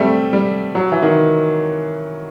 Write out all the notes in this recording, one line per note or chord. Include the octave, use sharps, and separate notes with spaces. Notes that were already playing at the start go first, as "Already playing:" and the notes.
Already playing: G3 A3 C4
G3
F#3
E3
D#3